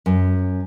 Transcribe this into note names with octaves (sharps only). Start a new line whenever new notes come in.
F#2